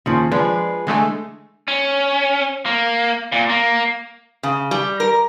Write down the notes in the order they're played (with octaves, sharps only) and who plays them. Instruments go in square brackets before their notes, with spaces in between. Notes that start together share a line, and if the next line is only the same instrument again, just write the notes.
[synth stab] D#2 [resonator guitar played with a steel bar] C#3 F3
[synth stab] F3 [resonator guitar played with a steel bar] G#3 D4 B4
[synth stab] D3 G#3 A3 [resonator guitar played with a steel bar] E3 G#5
[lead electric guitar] C#4
A#3
A#2
A#3
[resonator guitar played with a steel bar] C#3
G3
A#4